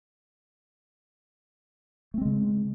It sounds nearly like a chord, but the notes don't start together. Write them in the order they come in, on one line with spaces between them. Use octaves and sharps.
A3 C4 G#3 C#3